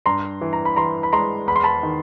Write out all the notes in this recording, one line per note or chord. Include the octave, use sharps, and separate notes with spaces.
G2 A#5 C6
E3
A#5
B5
E3 A#5 C6
B5
G#3 A#5 C6
E2 B5
C6
A5 B5
D#3